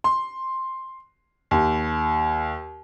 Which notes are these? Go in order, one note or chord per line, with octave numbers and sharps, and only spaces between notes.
C6
D#2